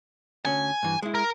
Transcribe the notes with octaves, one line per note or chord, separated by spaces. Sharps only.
D2 C#4 G#5
G2 E3
G#3 E4
A#4